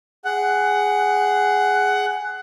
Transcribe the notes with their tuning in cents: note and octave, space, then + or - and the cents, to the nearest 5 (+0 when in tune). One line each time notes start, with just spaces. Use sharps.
G#4 +0 F#5 +15